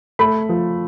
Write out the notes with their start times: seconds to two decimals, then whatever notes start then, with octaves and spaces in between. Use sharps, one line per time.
0.19 A3 B5
0.49 F3